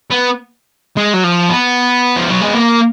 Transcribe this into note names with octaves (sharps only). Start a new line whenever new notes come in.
B3
G#3
F#3
F3
B3
F3
F#3
G#3
A#3